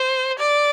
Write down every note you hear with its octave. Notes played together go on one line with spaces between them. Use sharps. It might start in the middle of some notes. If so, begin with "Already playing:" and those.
Already playing: C5
D5